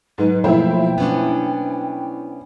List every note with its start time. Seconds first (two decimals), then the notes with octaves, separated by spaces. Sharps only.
0.18 G#2 F#3 B4
0.44 B2 F3 A3 A#3 E4 C5 G5
0.98 B3 C#4 D4